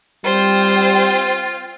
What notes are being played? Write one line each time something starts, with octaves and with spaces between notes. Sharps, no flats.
G3 C4 F4 C5 G5